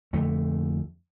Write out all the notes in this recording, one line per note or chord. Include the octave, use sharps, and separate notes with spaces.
F2 D3 A3